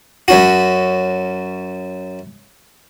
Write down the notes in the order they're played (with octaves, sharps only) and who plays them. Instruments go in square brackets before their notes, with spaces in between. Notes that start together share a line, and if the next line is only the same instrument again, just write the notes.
[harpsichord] F#2 C#4 F#4